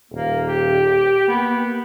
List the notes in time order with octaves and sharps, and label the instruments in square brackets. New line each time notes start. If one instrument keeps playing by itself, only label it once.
[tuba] D#1 [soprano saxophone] A#3
[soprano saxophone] G4
[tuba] A#3 [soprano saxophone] B3